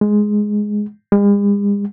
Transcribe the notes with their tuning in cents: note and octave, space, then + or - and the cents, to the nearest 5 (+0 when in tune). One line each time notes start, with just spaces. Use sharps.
G#3 +5
G#3 -45